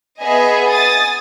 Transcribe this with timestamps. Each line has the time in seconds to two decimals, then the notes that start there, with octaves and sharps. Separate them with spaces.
0.22 B3 G#4 D#5 E5 G#5
0.71 G#5 D#6 A6